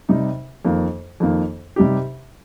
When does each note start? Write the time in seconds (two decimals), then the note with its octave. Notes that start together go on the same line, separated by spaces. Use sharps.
0.09 C3 G3 D#4
0.65 F2 D#3 A#3
1.20 F2 D#3 A#3
1.76 C3 G3 D#4 G4